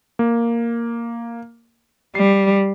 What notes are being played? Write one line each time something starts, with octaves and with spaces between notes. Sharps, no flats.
A#3
G3 C7